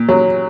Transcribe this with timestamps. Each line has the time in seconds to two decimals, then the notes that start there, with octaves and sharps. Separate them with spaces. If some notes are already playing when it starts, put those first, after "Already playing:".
Already playing: A#2
0.09 F#3